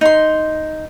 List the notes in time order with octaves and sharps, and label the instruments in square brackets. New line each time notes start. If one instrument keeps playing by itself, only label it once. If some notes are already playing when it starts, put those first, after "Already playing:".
[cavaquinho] D#4 C6